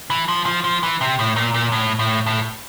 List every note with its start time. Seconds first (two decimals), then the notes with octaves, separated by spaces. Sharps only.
0.10 E3
0.28 F3
0.46 F3
0.64 F3
0.83 E3
1.01 C3
1.19 A2
1.36 A#2
1.54 A#2
1.72 A2
1.99 A2
2.26 A2